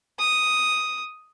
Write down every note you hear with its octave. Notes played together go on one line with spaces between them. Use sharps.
D#6